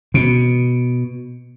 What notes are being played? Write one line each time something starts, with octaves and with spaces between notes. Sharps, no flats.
B2